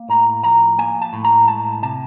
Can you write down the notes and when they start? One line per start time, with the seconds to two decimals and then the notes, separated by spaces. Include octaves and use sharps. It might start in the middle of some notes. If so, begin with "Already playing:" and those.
Already playing: A#3
0.09 A2 A#5
0.43 F3 A#5
0.78 A#3 G#5
1.02 A5
1.13 A2
1.24 A#5
1.48 G#3 A5
1.83 C3 A5